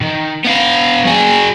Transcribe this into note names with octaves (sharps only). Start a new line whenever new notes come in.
D#3
B3 F5
F#3 G#4